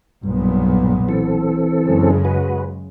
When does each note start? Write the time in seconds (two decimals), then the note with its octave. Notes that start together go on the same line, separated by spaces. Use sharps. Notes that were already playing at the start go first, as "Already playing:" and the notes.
0.23 B1 G2 A#2 B3
1.09 E3 C4 A4
1.85 F#2 C#3 G#3
2.25 F#4 B4